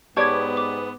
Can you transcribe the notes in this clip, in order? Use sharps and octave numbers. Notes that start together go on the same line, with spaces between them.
G#2 B3 G4 C#5 D5 A5 D6 G#6
D6